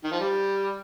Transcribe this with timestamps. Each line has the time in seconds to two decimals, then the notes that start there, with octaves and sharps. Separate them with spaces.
0.04 D#3
0.12 F3
0.19 G3